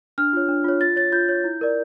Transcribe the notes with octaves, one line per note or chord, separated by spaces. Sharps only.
D4 F6
F4 C#5
D4
F4 C#5
F4 A6
C#5 A6
F4 G6
C#5
E4
A#4 D5